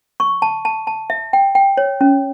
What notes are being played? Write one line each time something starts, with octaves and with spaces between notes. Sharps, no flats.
C#6
A5
A5
A5
E5
G5
G5
C#5
C#4